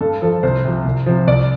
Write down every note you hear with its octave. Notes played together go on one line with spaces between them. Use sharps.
G2 A4
F3 A4
C2 C5
C3 F3
C2
C3 F3
C2 D5